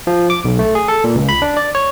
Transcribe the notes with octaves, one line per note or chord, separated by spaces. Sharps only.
F3
D6
B1
A3
G#4
A4
A#2
C#2
B5
D4
D5
C#5